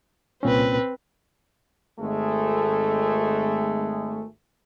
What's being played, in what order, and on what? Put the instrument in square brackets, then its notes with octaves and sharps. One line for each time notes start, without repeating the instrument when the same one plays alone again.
[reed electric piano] C2 A#2 C#4 [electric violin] C4 B4
[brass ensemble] G#1 G#3 A3